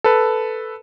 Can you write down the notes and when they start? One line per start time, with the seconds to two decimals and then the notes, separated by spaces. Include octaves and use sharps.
0.04 A4 B4